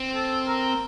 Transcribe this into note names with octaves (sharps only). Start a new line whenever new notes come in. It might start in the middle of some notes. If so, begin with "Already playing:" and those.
Already playing: C4
A4
A#4